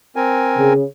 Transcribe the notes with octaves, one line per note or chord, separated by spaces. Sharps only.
C4 A#4 G#5
C#3